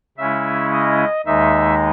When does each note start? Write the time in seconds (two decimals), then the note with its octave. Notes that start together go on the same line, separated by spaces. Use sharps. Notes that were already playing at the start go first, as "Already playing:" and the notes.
0.18 C#3 G#3 C#4 E4 E5
0.73 D#5
1.26 D#2 D#3 G#3 D#4 E5